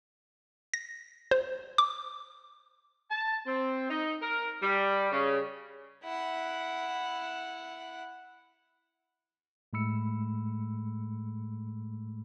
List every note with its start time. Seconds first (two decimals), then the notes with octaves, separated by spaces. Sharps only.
0.74 A#6
1.31 C5
1.78 D6
3.11 A5
3.47 C4
3.90 D#4
4.22 A#4
4.63 G3
5.12 C#3
6.04 E4 F#5
9.73 A2 G#3 A3 B5 E6 C#7